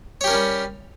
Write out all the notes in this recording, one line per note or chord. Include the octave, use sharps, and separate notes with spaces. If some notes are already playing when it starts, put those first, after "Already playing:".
G3 C#4 G4 A#4 C#5